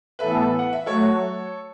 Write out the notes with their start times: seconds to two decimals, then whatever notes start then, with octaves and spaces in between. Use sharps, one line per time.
0.19 A2 E3 B3 A4 B4 E5
0.59 F#5
0.73 E5
0.86 F#3 A3 F#4 A4 C#5